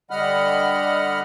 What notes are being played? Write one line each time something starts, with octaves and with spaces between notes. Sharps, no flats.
D3 G3 D#5 F#5 B5 F6